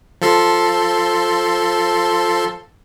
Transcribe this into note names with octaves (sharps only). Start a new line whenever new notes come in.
F3 A4 C6